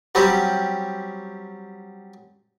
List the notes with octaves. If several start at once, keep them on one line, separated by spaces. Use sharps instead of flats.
F#3 G3 C4 C#4 G4